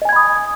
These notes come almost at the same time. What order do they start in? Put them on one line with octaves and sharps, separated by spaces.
D#5 G#5 G#6 B5 D#6